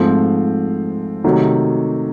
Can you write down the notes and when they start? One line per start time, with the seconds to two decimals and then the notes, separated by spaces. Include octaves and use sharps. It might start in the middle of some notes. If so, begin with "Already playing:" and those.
Already playing: G#2 F3 A3 C4
1.24 C3 D#3 F#3 A3